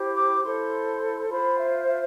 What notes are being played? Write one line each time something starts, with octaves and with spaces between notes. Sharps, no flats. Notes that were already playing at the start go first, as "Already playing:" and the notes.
Already playing: E4 G4 C5
D6
E4 A4 C5 C6
F4 C5 B5
E5
E5